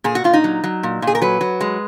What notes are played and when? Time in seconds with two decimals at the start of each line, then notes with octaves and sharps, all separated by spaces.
0.04 A#2 G#4
0.15 F#4
0.24 A#2 F4
0.33 D#4
0.44 F#3
0.64 F#3
0.83 A#2
1.02 A#2
1.07 G#4
1.15 A#4
1.22 F#3 B4
1.41 F#3
1.61 G#3